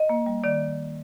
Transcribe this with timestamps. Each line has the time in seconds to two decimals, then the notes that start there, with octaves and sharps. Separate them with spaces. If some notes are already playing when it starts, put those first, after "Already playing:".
Already playing: D#5
0.09 A#3
0.26 G3
0.44 D#3 D5